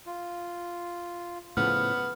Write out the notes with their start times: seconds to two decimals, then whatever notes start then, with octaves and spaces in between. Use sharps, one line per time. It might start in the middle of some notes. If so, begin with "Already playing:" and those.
0.06 F4
1.57 A2 C#3 F3 B3 F6